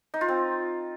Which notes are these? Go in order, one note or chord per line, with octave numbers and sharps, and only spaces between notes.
D#4
F4
C4